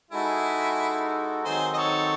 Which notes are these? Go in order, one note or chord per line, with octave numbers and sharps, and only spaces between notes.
G#3 D#4 E4 F#4 G#4 A4
D#3 F#3 C4 D#4 G#4 C5
D#5
A4 C#5